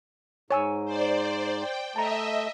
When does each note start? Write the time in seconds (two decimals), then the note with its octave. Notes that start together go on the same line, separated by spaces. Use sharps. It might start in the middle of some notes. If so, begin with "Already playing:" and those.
0.51 G#2 C#5 G#5 E6
0.85 C5 D5
1.59 G5
1.96 A3 D#5 E5 A5 A#5